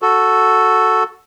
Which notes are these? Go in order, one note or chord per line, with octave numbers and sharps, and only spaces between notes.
F#4 A4